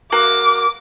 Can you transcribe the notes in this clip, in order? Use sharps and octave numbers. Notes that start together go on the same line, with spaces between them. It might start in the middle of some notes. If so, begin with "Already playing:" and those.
A#3 F#4 D6